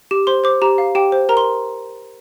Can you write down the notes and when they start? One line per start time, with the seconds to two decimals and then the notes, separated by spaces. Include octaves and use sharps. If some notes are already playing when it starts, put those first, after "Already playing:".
0.11 G4
0.27 C5 C6
0.44 C5 D6
0.62 G4 A#5
0.78 F5
0.95 G4 G5
1.12 C5
1.29 A#4 A#5
1.37 C6